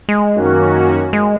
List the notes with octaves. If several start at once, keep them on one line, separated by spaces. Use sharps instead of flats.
G#3
F#2 D#3 A#3 C#4 F#4
G#3